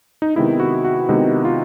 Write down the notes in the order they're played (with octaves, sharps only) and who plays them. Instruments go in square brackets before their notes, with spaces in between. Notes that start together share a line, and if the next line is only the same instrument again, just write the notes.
[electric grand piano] D#4
C3 D#3 G#3 B3 D#4 E4
F#4
F#4
C3 D#3 G#3 B3 D#4
F4